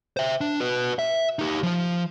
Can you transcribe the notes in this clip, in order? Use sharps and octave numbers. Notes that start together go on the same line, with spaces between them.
C5 E5
D4
F#4 B4
E5
D#4 G4
F3 F4